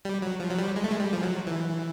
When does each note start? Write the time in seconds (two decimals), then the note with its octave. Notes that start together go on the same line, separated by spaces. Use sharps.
0.05 G3
0.22 F#3
0.40 F3
0.50 F#3
0.58 G3
0.76 G#3
0.84 A3
0.91 G#3
1.00 G3
1.13 F3
1.23 F#3
1.47 E3